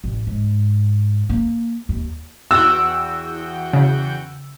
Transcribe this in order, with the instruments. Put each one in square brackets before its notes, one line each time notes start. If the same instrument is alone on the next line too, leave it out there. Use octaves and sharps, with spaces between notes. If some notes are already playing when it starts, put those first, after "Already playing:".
[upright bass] A1
G#2
A#3
D#2
[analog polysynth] E2 F#4 G5 [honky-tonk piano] E6
[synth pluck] C#3